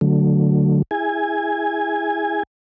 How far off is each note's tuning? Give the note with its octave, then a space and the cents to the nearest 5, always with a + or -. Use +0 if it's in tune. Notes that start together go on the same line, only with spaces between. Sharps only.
D3 +0 F#3 +0 A3 +5
E4 +0 G#4 -15 G#5 -5